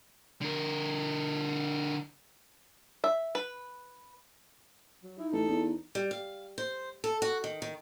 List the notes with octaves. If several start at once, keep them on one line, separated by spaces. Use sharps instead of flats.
D3 A#4
E5
B4
F#3
D#4 E4
A1 A4
E2
G3
F5
C5
A4
F#4
D#3
D#3